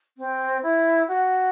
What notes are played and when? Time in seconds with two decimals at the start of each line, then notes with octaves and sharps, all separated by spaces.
0.18 C4
0.63 E4
1.08 F#4